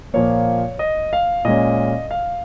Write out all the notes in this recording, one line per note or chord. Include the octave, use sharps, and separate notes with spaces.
A#2 F3 A#3 C#5
D#5
F5
A#2 G#3 C#4 D#5
F5